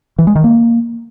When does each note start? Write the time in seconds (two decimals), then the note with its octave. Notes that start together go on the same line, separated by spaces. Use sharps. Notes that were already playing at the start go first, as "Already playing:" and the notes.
0.19 E3
0.27 G#3
0.35 D#3
0.44 A#3